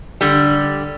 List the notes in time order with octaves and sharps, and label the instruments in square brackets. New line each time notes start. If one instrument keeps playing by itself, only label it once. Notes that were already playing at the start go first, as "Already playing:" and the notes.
[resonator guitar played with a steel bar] D3 G3